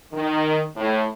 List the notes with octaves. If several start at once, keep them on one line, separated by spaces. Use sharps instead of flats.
D#3
A2